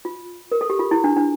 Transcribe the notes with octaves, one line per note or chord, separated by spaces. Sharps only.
F4
A#4
A4
G4
F4
E4
D4
D4